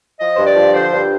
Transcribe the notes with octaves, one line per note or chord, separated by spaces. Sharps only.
F3 D#5
G2 C5
D5
F3
D3 C5
G2